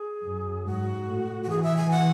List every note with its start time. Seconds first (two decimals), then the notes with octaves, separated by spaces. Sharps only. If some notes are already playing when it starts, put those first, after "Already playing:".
Already playing: G#4
0.24 F#2
0.65 G#2 F#4
1.08 A2
1.43 F#4
1.50 E3 G#4
1.63 E5
1.77 G#5
1.91 F#5